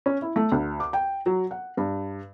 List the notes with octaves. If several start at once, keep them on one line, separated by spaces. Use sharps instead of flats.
C#4
E4
A3
D2
D6
G5
F#3
F#5
G2